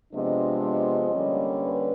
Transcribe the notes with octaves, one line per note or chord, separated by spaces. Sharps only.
C3 F3 G#3 B3 D4 D#5
D#5
D3 G3 A#3 C#4
B4